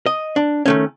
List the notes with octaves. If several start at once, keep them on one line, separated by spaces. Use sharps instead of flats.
D#5
D4
D#3 A3 C#4